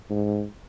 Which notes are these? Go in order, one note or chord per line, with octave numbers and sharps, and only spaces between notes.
G#2